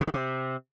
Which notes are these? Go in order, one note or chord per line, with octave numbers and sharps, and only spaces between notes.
B2
D#3
C3